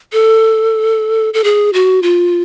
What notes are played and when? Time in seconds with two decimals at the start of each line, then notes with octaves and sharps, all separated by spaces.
0.13 A4
1.34 A4
1.44 G#4
1.73 F#4
2.03 F4